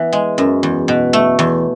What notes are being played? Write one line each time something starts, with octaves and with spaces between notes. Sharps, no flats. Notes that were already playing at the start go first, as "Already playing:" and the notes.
Already playing: E3 B3
G#3
F#2
E2
B2
A3
E2